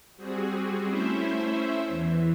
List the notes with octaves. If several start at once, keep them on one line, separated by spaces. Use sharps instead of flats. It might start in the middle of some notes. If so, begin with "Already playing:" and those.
G3 C4 F#4 G#4
A3 C#4 E4 C5 E5
E2 E3